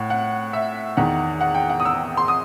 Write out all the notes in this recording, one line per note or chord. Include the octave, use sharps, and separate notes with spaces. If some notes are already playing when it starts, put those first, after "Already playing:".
Already playing: A2 F#5
F#5
E5
E2 D#3 F#5
F#5
G5
F#5
D#6
E6
C6
D#6